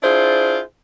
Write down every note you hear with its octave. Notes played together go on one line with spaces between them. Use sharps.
D4 E4 F4 G#4 C5